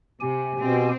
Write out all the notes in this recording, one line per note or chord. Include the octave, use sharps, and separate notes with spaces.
C3 G4 G#5
B2 C4